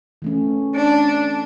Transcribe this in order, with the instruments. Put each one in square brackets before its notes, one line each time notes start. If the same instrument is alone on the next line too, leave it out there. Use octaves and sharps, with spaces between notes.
[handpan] E3 A3 C#4
[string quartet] D4